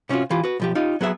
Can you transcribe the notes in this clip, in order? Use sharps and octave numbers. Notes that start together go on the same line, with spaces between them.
C3 C#4 D#4 F4 F#4
E3 F4 G4
F#4 B4
B1 F3 G4
D#4 F4 G4
F#3 B3 G#4 E5